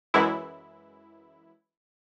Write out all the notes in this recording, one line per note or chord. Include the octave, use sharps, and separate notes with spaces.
F#2 E3 G#3 E4